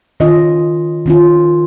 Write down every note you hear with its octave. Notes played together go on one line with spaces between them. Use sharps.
D#3 C#4 F4 D#5
D#3 C#4 F4